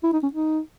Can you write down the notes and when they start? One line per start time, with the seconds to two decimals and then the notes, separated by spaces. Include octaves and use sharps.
0.03 E4
0.13 D#4
0.23 C#4
0.33 D#4